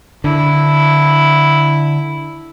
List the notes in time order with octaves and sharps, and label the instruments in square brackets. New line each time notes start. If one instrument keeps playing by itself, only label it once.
[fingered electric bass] D3 [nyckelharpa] E4